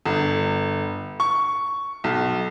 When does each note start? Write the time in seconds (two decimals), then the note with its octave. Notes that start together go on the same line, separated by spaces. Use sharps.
0.06 G1
1.20 C#6
2.04 B1